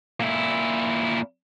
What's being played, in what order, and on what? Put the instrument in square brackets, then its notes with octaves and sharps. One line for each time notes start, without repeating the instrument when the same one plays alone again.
[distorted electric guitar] A#2 E4